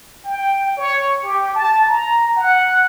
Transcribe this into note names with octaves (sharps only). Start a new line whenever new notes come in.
G5
C#5
G4
A5
A#5
F#5